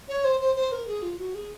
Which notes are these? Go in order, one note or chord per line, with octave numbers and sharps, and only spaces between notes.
C#5
C5
C5
C5
A#4
G#4
F4
F#4
G#4